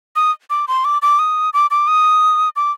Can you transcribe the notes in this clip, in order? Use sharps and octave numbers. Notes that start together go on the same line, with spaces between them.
D#6
D6
C6
D6
D6
D#6
D6
D6
D#6
D6